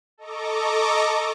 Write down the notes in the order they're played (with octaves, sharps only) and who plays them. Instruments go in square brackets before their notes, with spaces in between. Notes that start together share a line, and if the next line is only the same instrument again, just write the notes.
[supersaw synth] A4 D#5 A#5 C#6 D6